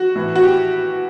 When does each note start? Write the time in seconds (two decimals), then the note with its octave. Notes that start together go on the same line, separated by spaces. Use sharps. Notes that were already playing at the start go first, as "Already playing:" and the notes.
Already playing: F#4
0.15 A2 E3
0.36 F#4
0.43 G4